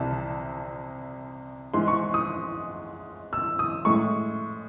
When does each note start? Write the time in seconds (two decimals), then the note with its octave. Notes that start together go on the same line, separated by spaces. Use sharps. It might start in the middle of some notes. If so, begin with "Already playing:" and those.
Already playing: C2 C3 E3 A5
1.74 G#2 E3 G#3 C6
1.88 C#6
2.14 D#6
3.33 E6
3.59 D#6
3.85 A2 G#3 C#6